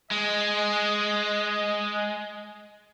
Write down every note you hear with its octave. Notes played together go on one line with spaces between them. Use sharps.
G#3 D#5